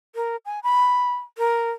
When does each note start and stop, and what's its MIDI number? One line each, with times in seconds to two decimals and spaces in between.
0.15 0.36 70
0.46 0.60 80
0.63 1.16 83
1.38 1.71 70